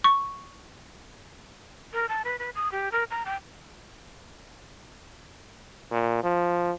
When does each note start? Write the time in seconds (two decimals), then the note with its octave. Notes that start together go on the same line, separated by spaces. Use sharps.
0.04 C#6
1.93 A#4
2.09 A5
2.25 B4
2.39 B4
2.55 D#6
2.72 G4
2.92 A#4
3.11 A#5
3.26 G5
5.91 A#2
6.23 F3